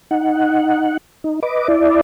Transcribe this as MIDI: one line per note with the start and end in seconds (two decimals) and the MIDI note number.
0.11 0.97 63
0.11 0.97 78
1.24 1.40 63
1.43 1.68 71
1.43 1.68 75
1.43 1.68 86
1.68 2.01 64
1.68 2.01 74